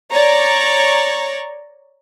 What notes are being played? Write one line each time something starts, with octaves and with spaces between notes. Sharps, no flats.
C#5 D5 A#5 C#6